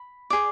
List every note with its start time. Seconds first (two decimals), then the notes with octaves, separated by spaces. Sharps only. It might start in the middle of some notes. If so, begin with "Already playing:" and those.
Already playing: B5
0.30 G#4 D5